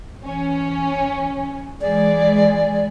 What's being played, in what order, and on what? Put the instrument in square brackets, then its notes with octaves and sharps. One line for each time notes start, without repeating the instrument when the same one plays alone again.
[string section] E3 C#4
[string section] E3 G#3 G#4 [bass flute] D5